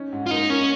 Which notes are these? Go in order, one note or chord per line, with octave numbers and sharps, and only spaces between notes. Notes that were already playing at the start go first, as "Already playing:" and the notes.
Already playing: C#4 D#4
G#2
F4
A#3 D#4
A#3 C#4